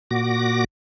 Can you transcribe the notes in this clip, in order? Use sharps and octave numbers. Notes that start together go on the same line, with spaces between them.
A#2 F#4 D6 A#6